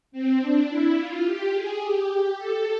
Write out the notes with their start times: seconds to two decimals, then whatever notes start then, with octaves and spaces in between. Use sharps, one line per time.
0.12 C4
0.40 D4
0.69 E4
0.96 F4
1.25 G4
1.53 G#4
1.82 G4
2.38 A4